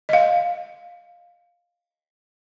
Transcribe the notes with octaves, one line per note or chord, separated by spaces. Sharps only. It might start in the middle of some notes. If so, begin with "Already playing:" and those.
D#5 F5